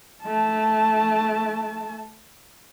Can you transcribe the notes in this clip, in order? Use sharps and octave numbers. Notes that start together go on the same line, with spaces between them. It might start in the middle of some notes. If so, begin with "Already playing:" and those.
A3 A5